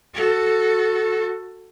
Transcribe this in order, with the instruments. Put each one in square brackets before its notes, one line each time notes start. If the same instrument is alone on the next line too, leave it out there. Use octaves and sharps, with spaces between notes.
[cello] F#4 A4